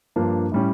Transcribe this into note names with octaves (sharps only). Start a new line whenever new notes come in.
G2 F3 A#3 D4
A2 G3 C#4